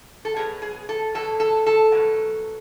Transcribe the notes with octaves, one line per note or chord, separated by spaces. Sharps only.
A4
B2 F#3 G#4
G#4
A4
B2 F#3 A4
A4
A4
B2 F#3